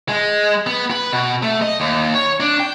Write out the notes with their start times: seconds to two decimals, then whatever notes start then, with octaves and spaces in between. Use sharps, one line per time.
0.09 G#3
0.67 B3
0.91 B4
1.12 B2
1.43 A3
1.62 D#5
1.80 D#2
2.15 C#5
2.40 D4
2.60 G5